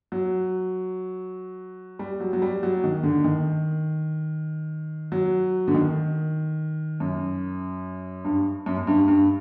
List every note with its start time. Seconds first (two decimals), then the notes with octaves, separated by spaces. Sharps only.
0.12 F#3
1.99 G3
2.20 F#3
2.33 F#3
2.42 G3
2.63 F#3
2.84 D#3
3.03 D3
3.24 D#3
5.12 F#3
5.68 D3
5.74 D#3
7.00 F#2
8.25 G2
8.66 F#2
8.78 F#2
8.87 G2
9.08 G2